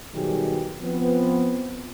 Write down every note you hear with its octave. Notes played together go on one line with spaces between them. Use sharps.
B2 D#3 F#3 G3 G4 G#4
F3 B3 C4